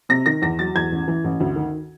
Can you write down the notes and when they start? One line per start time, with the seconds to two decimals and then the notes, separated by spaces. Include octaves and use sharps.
0.09 C3 A#6
0.26 D#3 A#6
0.42 E2 A#6
0.59 F#3 A6
0.75 E2 G#6
0.92 A1
1.08 E3
1.24 A1
1.40 D2
1.56 D#3